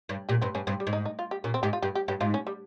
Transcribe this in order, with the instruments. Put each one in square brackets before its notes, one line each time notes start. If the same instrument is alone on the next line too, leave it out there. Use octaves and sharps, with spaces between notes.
[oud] G2
[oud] A#2 [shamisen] G4
[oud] G2 [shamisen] C4
[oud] G2 [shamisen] C#4
[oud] G2 [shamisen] C4
[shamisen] G3
[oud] G#2
[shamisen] D#4
D#4
F4
G4
[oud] A#2 [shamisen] C#4
[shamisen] C4
[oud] G#2 [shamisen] G4
[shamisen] F4
[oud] G2 [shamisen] G4
[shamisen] G4
[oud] G2 [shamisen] G4
[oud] G#2 [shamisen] F4
[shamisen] C#4
G3